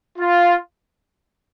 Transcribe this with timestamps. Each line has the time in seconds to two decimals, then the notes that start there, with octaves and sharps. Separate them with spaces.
0.19 F4